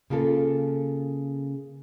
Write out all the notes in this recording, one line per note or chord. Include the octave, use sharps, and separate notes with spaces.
C#3 A#3 F4 A4